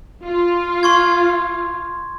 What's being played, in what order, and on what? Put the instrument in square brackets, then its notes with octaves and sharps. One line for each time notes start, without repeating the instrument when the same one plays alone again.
[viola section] F4
[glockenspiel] C6 C#6 G#6